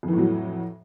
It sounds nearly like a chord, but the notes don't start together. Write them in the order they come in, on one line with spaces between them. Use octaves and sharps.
F2 E3 A2 F#3